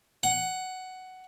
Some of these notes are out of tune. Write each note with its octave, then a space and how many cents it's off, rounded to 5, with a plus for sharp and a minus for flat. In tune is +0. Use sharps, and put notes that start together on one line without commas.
F#5 +10